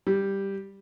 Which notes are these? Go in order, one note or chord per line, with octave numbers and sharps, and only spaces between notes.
G3